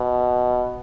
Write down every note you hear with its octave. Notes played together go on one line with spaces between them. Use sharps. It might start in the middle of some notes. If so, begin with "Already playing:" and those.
Already playing: B2